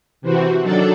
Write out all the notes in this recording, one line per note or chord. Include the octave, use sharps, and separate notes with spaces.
C3 E3 C4 F#4
D#3 F#3 D4 A4 D5